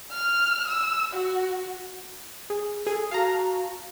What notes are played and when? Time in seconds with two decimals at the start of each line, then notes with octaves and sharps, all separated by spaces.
0.12 F6
0.68 E6
1.13 F#4
2.50 G#4
2.87 G#4 A4
3.11 F#4 F5 A5 A#5